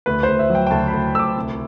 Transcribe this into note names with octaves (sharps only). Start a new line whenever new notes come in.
D2 B4
D2 C5
E5
F#3 G5
G5
D2 A5
B5
D2
D2 D6 E6
C2